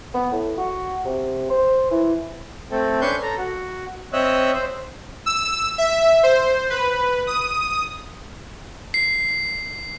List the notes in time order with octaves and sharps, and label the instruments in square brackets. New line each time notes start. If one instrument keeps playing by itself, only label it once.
[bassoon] B3
A2
F#4
C3
C5
E3
[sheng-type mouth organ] A3 C4 A4
C#4 D4 B4 C6 C#6 G6
A4 A#5
F#4
C4 C#5 D#5 E5 E6 F#6
C5
[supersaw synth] E6
E5
C5
B4
D#6
[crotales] C7